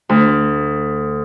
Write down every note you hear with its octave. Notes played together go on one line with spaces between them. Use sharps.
D2